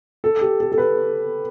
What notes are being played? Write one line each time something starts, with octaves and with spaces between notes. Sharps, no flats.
A4
G4
A4
A4
B4